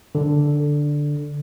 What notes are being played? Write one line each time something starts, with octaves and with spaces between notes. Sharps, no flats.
D3